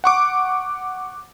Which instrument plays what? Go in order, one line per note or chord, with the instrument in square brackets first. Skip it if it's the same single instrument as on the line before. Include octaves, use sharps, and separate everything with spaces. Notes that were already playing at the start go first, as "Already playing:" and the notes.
[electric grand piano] F#5 C#6 D6